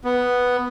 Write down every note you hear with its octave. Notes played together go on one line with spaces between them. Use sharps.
B3